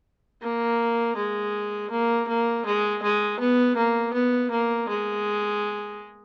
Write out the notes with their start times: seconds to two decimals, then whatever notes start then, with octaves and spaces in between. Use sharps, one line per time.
0.42 A#3
1.16 G#3
1.91 A#3
2.28 A#3
2.66 G#3
3.03 G#3
3.39 B3
3.77 A#3
4.13 B3
4.51 A#3
4.88 G#3